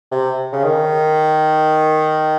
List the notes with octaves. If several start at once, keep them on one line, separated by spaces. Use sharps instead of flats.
C3
C#3
D#3